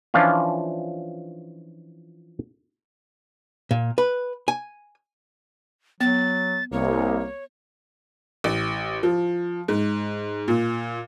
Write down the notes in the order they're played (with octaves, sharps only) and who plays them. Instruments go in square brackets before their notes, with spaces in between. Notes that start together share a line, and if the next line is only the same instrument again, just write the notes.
[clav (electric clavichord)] E3 F3 C#4 D4 F4
[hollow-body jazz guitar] A#2
B4
G#5
[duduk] F#3 [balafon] B3 [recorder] A6
[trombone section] C2 [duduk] A#3 [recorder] C#5
[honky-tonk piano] A1
F3
G#2
A#2